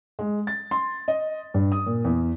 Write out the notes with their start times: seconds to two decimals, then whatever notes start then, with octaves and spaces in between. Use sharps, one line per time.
0.19 G#3
0.47 A6
0.71 C6
1.08 D#5
1.54 G2
1.72 D#6
1.86 A#2
2.05 E2